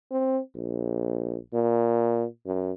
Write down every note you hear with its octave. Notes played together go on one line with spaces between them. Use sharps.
C4
A#1
A#2
F#2